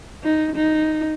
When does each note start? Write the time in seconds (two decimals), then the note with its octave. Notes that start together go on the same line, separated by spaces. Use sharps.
0.24 D#4
0.56 D#4